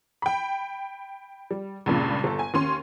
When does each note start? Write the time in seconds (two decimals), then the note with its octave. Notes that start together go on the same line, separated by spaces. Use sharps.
0.22 G5 B5
1.51 G3
1.86 C#2 G2 A#2 C#3
2.24 G1 A4
2.39 G#5
2.54 D#2 C#4 C6